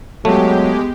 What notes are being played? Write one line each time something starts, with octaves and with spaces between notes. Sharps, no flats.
F#3 G#3 A3 B3 G4